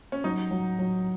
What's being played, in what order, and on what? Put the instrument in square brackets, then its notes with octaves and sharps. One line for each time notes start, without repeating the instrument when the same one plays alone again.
[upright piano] C#4
[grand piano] F#3 [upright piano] D#4
[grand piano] F#3
F#3